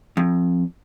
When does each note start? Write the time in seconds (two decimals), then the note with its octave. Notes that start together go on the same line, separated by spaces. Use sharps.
0.17 F2